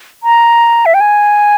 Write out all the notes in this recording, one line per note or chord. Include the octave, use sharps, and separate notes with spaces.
A#5
E5
G5
G#5